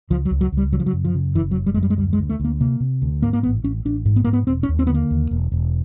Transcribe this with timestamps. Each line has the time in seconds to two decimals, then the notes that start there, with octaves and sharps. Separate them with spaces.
0.10 C#2 F3
0.25 F#3
0.31 C#2
0.41 F#3
0.52 C#2
0.57 G3
0.73 C#3 F#3
0.80 F3
0.86 F#3
0.93 F#2
1.05 F3
1.15 C#3
1.35 F#1 E3
1.51 F#3
1.56 F#2
1.66 G3
1.74 F#2 G#3
1.83 G3
1.90 G#3
1.98 D2 G3
2.13 G#3
2.19 D2
2.29 A3
2.40 D2 A#3
2.61 C3 A#3
2.80 C3
3.02 D2
3.22 G#2 A#3
3.33 A#3
3.43 A1 B3
3.64 A1 C#4
3.85 A1 D4
4.05 G#2
4.16 B3
4.24 G#2 A#3
4.33 B3
4.47 E1 C4
4.63 C#4
4.69 D#2
4.79 C4
4.87 D3 B3
4.94 A#3
5.11 D#2
5.31 E1
5.52 E1